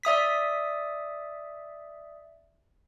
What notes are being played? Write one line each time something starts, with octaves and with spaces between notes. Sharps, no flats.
D5 E5 D#6 B6